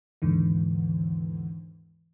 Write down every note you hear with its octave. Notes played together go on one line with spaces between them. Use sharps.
D#2 G#2 D3 E3